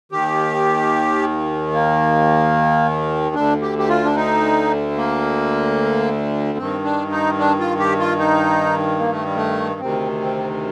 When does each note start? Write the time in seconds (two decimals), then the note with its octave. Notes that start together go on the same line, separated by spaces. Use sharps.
0.12 D#2 D#3 G4
1.74 A#3
3.35 D2 D3 D4
3.62 G4
3.78 G4
3.88 F4
4.04 D4
4.16 D#4
4.96 A#3
6.58 G2 D#3 C4
6.85 D4
7.12 D#4
7.39 D4
7.59 F4
7.80 G4
7.99 F4
8.19 D#4
8.99 A#3
9.12 A3
9.24 G3
9.36 A3
9.80 D2 C3 D#3 C4
10.21 C4